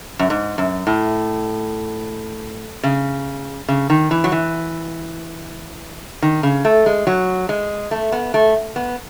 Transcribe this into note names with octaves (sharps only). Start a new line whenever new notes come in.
F#2
G#2
F#2
A2
C#3
C#3
D#3
E3
F#3
E3
D#3
C#3
A3
G#3
F#3
G#3
A3
B3
A3
B3